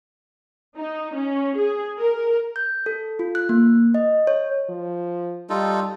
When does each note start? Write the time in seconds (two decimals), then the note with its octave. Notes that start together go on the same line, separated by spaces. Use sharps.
0.76 D#4
1.14 C#4
1.56 G#4
1.98 A#4
2.56 G6
2.86 A4
3.19 F4
3.35 F#6
3.49 A#3
3.95 D#5
4.27 C#5
4.69 F3
5.50 G3 D#4 F4 A4